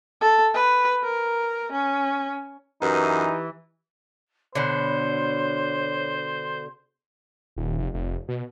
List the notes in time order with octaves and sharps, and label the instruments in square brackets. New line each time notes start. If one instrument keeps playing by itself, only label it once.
[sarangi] A4
B4
A#4
C#4
[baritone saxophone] F#2 [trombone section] E3 [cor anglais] D#4 [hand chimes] G4 B4
[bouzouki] B2 D3 [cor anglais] C5 [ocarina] C#5
[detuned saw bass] D#1
F1
F1
B2